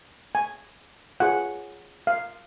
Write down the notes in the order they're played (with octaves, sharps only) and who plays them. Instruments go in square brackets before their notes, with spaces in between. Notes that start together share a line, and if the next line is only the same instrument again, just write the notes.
[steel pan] G#5
F4 G#4 C#5 F#5
F5